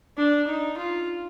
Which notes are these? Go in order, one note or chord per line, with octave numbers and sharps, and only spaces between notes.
D4
D#4
F4